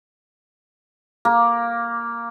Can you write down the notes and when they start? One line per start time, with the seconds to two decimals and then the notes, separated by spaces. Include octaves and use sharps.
1.25 A#3